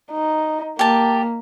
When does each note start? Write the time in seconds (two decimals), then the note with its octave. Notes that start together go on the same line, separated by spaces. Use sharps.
0.12 D#4
0.79 A#3 G4 A5